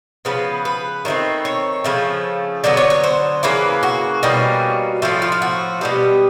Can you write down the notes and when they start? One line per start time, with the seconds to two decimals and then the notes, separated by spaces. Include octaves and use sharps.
0.25 C#3 F3 B3 B4
0.65 B4
1.05 D#3 F#3 A3 C4
1.45 C#5
1.84 C#3 F3 A3
2.64 D3 F#3 B3 D5
2.77 C#5
2.90 C#5
3.04 C5
3.43 C#3 E3 A#3 B4
3.83 F#4
4.23 B2 G3 A#3 C#4
5.02 A2 F3 A3 F4
5.22 F4
5.32 F4
5.42 F#4
5.81 B2 G3 B3 G4